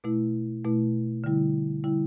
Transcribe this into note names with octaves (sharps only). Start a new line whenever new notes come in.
B2 A3 E4
B2 A3 E4
D3 G3 E4
D3 G3 E4